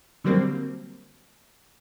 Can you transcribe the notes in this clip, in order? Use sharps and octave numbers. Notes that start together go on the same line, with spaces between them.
D3 F#3 G3 A#3 C4